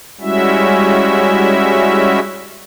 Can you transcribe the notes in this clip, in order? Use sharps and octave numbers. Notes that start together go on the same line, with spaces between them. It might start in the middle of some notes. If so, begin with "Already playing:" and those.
G3 G#3 C#4 E4 F#4 E5